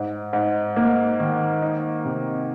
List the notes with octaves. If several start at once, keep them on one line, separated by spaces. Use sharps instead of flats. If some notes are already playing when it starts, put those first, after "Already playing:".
Already playing: G#2
G#2
A#3
D#3
D#4
C3